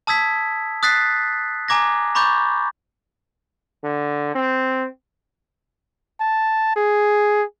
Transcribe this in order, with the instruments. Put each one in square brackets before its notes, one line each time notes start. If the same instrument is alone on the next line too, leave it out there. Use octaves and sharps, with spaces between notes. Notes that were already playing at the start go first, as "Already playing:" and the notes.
[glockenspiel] A5 D#6 E6 G#6 B6
D#6 F#6 A6 B6 C7
G#5 A#5 D6 G#6 A#6
A#5 B5 C#6 D6 G6 A6
[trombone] D3
C4
[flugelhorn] A5
G#4